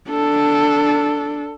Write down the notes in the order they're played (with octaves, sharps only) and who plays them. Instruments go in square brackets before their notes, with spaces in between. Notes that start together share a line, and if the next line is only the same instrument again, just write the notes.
[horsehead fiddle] D4 [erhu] A4